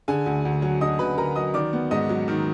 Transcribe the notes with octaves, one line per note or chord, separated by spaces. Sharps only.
D3 G#4 G#5
D2
D2
F#3
D3 D#5 D#6
D2 B4 B5
D2 A#4 A#5
F#3 D#5 D#6
D#3 D5 D6
B3
G#2 D#5 D#6
F#3
D#3